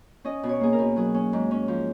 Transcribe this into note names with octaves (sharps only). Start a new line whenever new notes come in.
C#4 D#5
B2
C#5
A#3 G#4
A#4
B2
F#3 G#4
C#4
G#2
C#4
F3